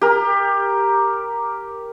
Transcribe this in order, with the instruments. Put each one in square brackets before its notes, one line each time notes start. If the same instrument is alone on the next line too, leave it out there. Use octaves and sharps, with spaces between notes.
[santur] G4 A#4